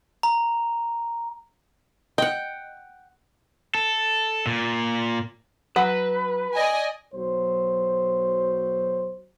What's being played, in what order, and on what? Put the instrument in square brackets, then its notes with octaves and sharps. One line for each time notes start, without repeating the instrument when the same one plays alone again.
[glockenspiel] A#5
[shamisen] D#5 [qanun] F#5 G5
[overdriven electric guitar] A4
A#2
[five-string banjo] F#3 [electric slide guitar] B4
[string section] D5 D#5 G#5
[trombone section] B1 F#3 C5